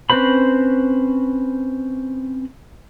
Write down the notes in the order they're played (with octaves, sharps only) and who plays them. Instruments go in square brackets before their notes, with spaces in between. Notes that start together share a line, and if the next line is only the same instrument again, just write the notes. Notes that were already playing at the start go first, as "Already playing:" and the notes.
[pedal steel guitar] C4 C#4 B4 C5 B5